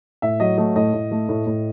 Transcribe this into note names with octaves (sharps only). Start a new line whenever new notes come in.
A2 E5
F#3 D#5
A3 D#5
A2 D#5
A2
A3
A2
A2